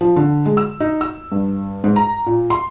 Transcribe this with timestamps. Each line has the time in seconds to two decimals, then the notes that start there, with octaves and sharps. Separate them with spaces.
0.01 F3
0.16 D3
0.46 G#3
0.57 E6
0.80 D#4
1.01 E6
1.32 G2
1.84 G#2
1.96 A#5
2.26 A#2
2.50 C6